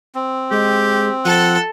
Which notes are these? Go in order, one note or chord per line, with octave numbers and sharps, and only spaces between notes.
C4
G#3 G4
F3 A4 F#5 A5